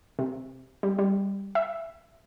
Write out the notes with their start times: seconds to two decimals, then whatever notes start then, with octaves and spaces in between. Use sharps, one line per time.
0.19 C3
0.83 G3
0.99 G3
1.55 E5